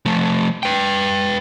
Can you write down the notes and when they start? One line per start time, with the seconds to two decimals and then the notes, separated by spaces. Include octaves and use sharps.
0.06 F3 A3
0.63 B4 G5